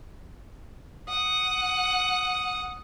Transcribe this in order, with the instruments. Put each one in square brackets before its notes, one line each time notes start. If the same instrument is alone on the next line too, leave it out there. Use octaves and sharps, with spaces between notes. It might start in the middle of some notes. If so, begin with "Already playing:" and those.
[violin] F#5 [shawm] D#6